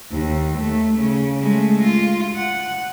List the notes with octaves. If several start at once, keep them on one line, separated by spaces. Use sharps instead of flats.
D#2
A3
C#3
G#3 A3
F4
F#5